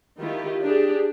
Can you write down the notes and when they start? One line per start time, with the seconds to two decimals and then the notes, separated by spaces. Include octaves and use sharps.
0.20 D#3 E4 F4 G4
0.63 D4 G4 G#4